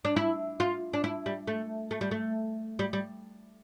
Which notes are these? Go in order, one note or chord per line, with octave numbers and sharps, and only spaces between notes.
D4
E4
F4
D4
E4
G3
A3
A3
G3
A3
G3
G3